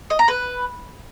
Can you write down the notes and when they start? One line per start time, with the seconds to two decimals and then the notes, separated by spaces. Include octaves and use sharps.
0.10 D#5
0.19 A#5
0.28 B4